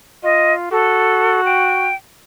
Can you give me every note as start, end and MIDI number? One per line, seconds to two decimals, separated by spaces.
0.24 0.69 65
0.24 0.53 75
0.71 1.91 66
0.71 1.41 69
1.45 1.95 79